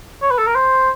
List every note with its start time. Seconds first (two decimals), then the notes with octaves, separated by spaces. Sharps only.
0.22 C#5
0.31 B4
0.38 A4
0.47 A#4
0.55 C5